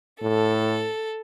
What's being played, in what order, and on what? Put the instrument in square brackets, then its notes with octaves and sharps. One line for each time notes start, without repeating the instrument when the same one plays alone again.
[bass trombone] A2 [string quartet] A4